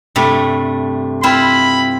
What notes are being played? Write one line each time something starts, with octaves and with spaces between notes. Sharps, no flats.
G2 C3 A3
C4 E4 F4 B5